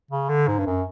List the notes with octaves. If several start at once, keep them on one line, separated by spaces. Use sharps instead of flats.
C#3
D3
G#2
G2
F#2